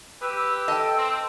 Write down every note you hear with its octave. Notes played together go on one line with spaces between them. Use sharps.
G4 B4 E6
A4 D#5 G5
C4